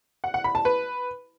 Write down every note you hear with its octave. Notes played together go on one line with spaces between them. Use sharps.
F#5
F#5
B5
A5
B4